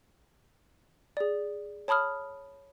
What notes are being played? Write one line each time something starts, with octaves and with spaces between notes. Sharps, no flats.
G#4 D5
C#5 A5 B5 D#6 F6